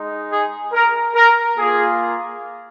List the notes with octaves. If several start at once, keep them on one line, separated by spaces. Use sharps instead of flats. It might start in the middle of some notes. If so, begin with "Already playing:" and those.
Already playing: G#3 D#4
G#4
A#4
A#4
A#3 F4 G#4